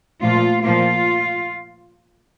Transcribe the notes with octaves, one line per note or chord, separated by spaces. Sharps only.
A#2 F3 A3 F4
A#2 F3 A#3 F4